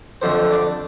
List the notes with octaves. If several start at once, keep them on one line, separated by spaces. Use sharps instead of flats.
F2 D3 A3 C5
D5